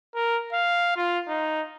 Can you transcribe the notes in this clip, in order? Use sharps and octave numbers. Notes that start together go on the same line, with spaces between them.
A#4
F5
F4
D#4